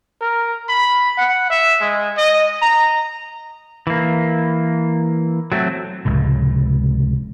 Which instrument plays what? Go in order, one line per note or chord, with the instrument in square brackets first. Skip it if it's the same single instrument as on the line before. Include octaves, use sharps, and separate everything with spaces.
[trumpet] A#4
B5
F#5
E5
G#3
D#5
A#5
[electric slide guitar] E3 A#3
F#3 A3 C4
[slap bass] F1 C#2 A2